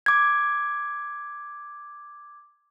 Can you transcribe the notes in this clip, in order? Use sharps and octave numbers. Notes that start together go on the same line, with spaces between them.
D6 G#6